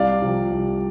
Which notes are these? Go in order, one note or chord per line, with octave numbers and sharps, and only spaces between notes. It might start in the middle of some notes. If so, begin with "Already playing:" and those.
Already playing: C2 D5 F5
C3 F3
C2